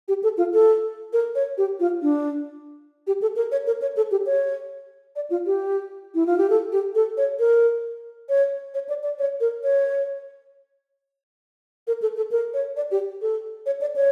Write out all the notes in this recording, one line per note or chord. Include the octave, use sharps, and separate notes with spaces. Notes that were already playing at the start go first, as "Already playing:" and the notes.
G4
A4
F4
A4
A#4
C#5
G4
F4
D4
G4
A4
A#4
C#5
A#4
C#5
A4
G4
C#5
D5
F4
G4
E4
F4
G4
A4
G4
A4
C#5
A#4
C#5
C#5
D5
D5
C#5
A#4
C#5
A#4
A4
A4
A#4
C#5
D5
G4
A4
C#5
D5
C#5